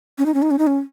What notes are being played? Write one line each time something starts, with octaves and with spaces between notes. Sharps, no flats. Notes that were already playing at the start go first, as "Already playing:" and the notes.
C#4
D#4
C#4
D#4
C#4
D#4
C#4